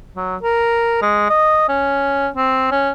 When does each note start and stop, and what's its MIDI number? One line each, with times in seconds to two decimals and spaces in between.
0.16 0.36 54
0.42 0.99 70
1.02 1.25 56
1.30 1.68 75
1.69 2.29 61
2.36 2.68 60
2.71 2.92 61